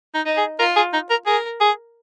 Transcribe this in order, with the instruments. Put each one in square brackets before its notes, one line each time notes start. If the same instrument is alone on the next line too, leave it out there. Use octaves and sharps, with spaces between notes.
[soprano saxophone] D#4
[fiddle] D#4
[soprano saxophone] G#4
[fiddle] F4 [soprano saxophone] A#4
[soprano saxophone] G#4
D#4
A#4
[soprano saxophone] G#4 [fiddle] A#4
[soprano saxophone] G#4